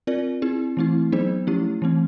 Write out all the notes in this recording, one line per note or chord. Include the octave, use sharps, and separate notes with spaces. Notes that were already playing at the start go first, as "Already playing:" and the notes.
C4 F4 A#4 D5
C4 E4 G#4
E3 A3 C4 E4
F#3 B3 D#4 G#4 C5
F3 A3 C#4 E4 G4
E3 A3 C4